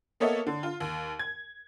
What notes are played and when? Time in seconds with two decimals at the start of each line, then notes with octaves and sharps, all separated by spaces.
0.20 A#3 B3 A4 C#5 D#5 E5
0.47 D3
0.63 F4
0.80 D#2
1.19 G#6